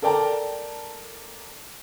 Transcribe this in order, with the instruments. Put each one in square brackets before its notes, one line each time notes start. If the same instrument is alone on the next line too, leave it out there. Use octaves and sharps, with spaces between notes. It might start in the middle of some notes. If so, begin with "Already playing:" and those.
[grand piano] A4 A#4 D5 G5 A5 A#5